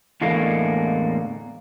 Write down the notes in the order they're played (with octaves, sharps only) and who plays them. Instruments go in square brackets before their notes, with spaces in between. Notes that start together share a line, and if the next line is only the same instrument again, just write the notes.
[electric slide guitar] E2 A2 D3 G#3 A#3